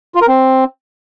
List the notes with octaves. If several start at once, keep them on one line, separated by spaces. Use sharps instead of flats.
F4
A#4
C4